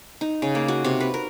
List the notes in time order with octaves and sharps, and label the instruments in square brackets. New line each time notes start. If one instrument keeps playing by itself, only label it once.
[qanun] D#4
C#3
A#3
F#4
C3
B4
A#4